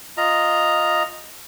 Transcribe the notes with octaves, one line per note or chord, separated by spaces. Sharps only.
F4 D#5 A#5